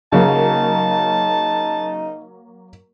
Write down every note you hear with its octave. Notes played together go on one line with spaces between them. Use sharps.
C#3 F#3 A#3 D#4 A5